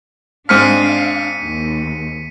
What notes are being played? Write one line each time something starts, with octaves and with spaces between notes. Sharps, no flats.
G#2 C4 D4 F5 F6 B6 C#7 D#7
D#2